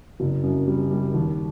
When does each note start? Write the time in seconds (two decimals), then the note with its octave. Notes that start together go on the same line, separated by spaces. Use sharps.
0.20 F#1
0.43 F#2
0.67 G3
0.91 G3
1.14 D#2